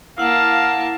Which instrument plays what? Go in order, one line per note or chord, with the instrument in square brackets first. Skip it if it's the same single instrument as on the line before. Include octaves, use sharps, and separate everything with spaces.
[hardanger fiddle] A#3 A5 [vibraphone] E4 F#5 [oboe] F5